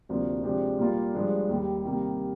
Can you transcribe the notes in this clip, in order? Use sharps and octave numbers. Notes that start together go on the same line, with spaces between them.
D2 C3 F3 A#3 D4
C3 F3 G#3 D4 G4
A#2 G3 A#3 F4
G2 F3 G#3 D4
D#2 D#3 G3
C3 D#3 G3 A#3